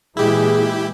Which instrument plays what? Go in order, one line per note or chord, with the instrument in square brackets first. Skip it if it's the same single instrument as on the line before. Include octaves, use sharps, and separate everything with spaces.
[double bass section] A#2 E3 G#3 [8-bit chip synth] E4 G4 [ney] G#4